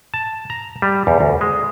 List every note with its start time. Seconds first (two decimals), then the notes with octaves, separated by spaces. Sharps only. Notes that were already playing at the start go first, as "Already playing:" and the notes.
0.14 A5
0.50 A#5
0.82 G3
1.07 E2
1.21 D2
1.41 G#3